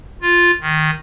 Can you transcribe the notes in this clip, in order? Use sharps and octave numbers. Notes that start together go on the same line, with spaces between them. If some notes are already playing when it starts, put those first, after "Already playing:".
F4
D#3